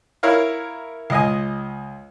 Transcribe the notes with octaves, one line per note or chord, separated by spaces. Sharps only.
E4 A#4 C#5 F5
C#2 D#5 G#5